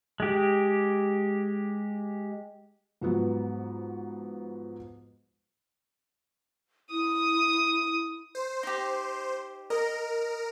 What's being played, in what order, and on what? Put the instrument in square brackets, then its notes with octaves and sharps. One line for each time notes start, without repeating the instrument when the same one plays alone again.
[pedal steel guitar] G#3 G4
[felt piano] G#2 F3 F#3 B3
[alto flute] E4 [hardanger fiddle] D#6
[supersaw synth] C5
[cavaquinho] D#4 G4
[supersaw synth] A#4 [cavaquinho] D#5